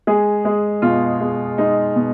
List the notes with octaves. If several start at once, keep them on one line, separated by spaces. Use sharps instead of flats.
G#3 G#4
G#3
B2 F4
G#3
G#3 D#4
B2